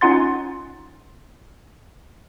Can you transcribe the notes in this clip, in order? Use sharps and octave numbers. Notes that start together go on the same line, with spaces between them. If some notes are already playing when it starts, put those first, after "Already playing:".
C#4 D#4 F4 F#5 C6 A6